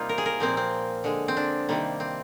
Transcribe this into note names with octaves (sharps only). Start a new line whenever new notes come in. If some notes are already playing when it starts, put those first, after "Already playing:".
Already playing: C3 G3 A#3 D#4 F4
A#4
G#4
A#4
A#2 F3 A#3 C4
C4
D3 G#3
C4
D4
C3 D#3 G3 A#3
C4